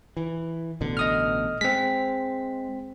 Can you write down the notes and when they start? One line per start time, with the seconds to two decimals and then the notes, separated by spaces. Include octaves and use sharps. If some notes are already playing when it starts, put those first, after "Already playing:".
0.17 E3
0.81 A1 B2 D3
0.97 D#5 D#6 F6
1.61 G#3 C4 B6